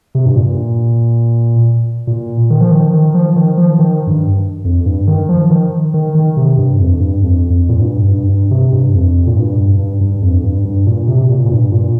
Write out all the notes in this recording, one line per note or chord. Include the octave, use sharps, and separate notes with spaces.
C3
G2
A#2
A#2
D#3
F3
D#3
D#3
F3
D#3
F3
D#3
G2
F2
G2
D#3
F3
D#3
D#3
D#3
C3
G2
F2
G2
F2
F2
A#2
G2
G2
G2
C3
G2
F2
A#2
G2
G2
G2
F2
G2
G2
A#2
C3
A#2
A#2
G2
A#2